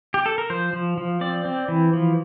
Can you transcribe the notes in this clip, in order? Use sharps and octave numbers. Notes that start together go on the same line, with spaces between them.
G4
A4
A#4
F3 C5
F3
F3
C4 D5
C4
E3
F3